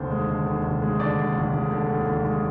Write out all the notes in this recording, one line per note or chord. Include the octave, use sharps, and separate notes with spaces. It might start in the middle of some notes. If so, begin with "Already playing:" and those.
Already playing: F1 D#2 D3 C5
G#3
D3
D#2
F1
G#3
D3 D5
D#2
F1
G#3
D3
D#2
F1
G#3